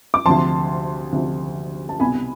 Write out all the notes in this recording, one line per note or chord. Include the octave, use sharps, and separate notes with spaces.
D6
D2 C3 F3 A5 C6
D2 C3 F3
A5
C2 B2 B3 G#5 B5